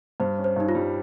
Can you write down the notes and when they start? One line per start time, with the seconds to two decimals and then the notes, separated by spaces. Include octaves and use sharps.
0.20 G2 C5
0.38 C#4
0.44 C5
0.56 G2 D#4
0.69 F4
0.75 G3